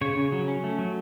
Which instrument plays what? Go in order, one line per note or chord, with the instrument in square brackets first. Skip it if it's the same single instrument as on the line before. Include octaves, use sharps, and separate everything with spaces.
[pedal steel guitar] C#3 C#5
C#3
F#3
C#4
A3
F#3